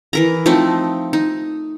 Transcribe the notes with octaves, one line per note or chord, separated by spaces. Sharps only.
E3 A#4 A#5
F3 A3 C4 D#4
D#4